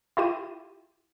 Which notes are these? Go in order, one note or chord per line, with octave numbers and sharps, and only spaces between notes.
E4 F4 G4 D#7